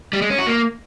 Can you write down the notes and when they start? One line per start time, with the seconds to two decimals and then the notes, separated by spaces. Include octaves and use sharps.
0.13 G3
0.22 G#3
0.30 C#4
0.38 F#4
0.47 A#3